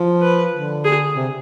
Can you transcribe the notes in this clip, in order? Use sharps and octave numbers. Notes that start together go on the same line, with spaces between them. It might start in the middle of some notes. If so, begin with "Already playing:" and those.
Already playing: F3
B4
D3
G#4
C3